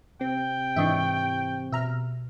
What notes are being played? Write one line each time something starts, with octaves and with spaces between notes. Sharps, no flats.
C3 C4 G5
G#2 E3 D4 D#5 E5 C#6
B2 E5 A#5 F6